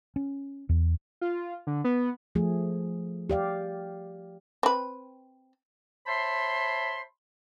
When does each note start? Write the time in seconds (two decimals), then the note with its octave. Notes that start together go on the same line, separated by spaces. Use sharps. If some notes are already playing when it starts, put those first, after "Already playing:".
0.16 C#4
0.69 E2
1.21 F4
1.67 D3
1.84 B3
2.35 F3 A3 G#4
3.30 G4 D5 F5
4.63 C4 B4
6.06 C5 C#5 E5 A5 B5 C6